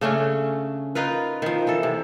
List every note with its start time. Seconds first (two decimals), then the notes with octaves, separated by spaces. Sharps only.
0.01 C#3 A3 C#4 D4
0.95 D#4 F4 A#4 B4
1.42 D#3 F3
1.67 E3 A4
1.83 C3